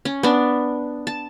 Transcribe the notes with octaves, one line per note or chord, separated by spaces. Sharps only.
C#4
B3 D4
A5